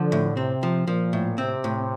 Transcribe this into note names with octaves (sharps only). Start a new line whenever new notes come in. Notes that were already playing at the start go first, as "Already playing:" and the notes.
Already playing: D3 F3
A2
C3 C4
F3
A#2 F3
A2
C3 C4
A2